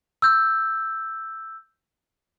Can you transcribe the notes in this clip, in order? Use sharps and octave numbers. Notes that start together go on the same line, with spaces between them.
E6 G6